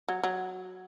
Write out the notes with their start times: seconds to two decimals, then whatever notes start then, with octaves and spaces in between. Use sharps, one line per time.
0.08 F#3
0.23 F#3